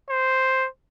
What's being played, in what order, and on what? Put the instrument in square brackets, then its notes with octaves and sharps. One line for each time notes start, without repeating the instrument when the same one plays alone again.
[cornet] C5